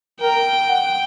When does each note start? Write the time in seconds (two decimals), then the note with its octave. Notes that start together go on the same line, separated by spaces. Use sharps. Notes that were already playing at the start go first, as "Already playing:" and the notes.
0.20 A#4 G5
0.69 F#5